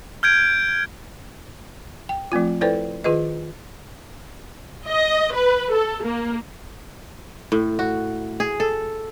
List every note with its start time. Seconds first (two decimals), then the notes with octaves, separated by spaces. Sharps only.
0.23 F6 G6 G#6 D7
2.09 G5
2.32 F3 A3 C4 F4
2.61 E4 A4 B4 C5 D5 G5
3.04 D#3 F4 G#4 B4 D#5
4.90 D#5
5.34 B4
5.73 A4
6.04 A#3
7.52 A2
7.79 F#4
8.40 G#4
8.60 A4